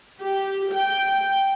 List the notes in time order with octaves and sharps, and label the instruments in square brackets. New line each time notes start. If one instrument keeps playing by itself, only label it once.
[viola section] G4
G5